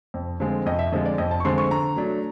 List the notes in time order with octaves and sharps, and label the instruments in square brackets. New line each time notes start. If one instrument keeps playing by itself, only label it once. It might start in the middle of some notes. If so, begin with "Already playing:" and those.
[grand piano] F2
D3 F3 G#3 C4
F2 D#5
E5
D3 F3 G#3 C4 D#5
D5
F2 D#5
A5
C#6
D3 F3 G#3 C4 C6
C#6
D3 A#5
F#3 A3 D4